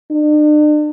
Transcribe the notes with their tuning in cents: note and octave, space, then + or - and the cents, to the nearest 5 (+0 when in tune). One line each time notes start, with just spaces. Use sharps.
D4 +45